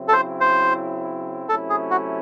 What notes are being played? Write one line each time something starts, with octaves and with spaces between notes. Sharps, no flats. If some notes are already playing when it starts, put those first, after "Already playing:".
Already playing: C#3 F#3 C4 E4
A4
C5
C5
C3 F#3 A3 C#4 E4 A4
G#4
F#4